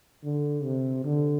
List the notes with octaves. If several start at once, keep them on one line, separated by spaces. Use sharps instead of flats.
D3
C3
D3